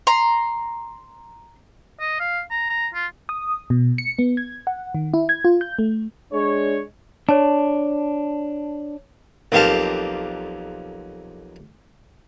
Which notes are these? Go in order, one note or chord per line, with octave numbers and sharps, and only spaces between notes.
A#5 C6
D#5
F5
A#5
A#5
F4
D#6
B2
C#7
B3
G#6
F#5
D#3
E4
G#6
F4
G6
A3
G#3 D4 C#5
D4 C#5 A5
B1 F2 A#3 G4 F5 A5